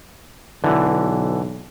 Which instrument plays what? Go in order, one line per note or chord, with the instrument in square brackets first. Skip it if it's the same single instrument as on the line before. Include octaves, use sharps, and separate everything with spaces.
[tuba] B1 [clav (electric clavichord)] D3 E3